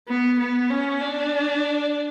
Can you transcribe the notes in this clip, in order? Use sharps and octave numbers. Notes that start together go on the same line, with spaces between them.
B3
B3
C#4
D4